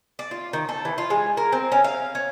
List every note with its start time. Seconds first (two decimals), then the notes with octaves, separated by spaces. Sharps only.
0.19 D5
0.31 F4
0.53 D#3
0.69 A4
0.85 E3
0.98 F4
1.10 G#3
1.37 A#4
1.52 C4
1.72 C#4
1.84 F5
2.15 C#4